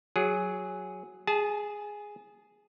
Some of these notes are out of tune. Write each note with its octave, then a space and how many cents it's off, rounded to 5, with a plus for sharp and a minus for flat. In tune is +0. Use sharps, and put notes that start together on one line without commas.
F#3 +0 G#4 +0
G#4 +0 A5 -35